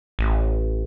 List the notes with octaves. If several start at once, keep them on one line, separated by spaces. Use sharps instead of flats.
A1